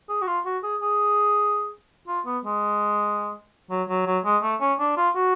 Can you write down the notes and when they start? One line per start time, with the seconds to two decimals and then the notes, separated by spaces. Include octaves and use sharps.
0.09 G#4
0.22 F#4
0.27 F4
0.45 F#4
0.63 G#4
0.81 G#4
2.08 F4
2.26 B3
2.45 G#3
3.70 F#3
3.89 F#3
4.06 F#3
4.25 G#3
4.43 A3
4.61 C#4
4.79 D4
4.97 F4
5.16 F#4